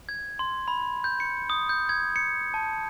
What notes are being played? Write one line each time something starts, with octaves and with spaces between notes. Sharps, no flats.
G#6
C6
B5
G6
C#7
D#6
G6
G#6
C#7
A5